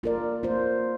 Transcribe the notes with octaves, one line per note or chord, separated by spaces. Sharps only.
A#3 F4 A#4 D5
A#3 F4 C5